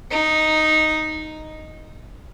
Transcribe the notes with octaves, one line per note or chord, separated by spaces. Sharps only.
D#4